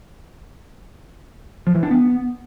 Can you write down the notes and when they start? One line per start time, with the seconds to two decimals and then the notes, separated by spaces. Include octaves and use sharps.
1.67 F3
1.75 E3
1.83 D4
1.91 B3